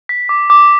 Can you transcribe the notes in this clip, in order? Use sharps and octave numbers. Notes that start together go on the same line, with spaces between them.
B6
D6
D6